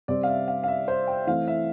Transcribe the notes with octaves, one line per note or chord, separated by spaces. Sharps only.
C3 G3 C4 D5
F5
E5
F5
F5
E5
C5
G5
E3 A3 C4 F5
E5